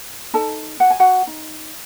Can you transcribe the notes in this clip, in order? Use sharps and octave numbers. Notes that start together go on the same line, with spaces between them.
D#4 A4 A5
F#4 F#5
G#5
F#4 F#5
D#4